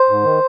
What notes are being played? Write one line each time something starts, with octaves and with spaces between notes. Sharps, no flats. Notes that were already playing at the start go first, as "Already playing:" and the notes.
Already playing: C5
G#2
D#3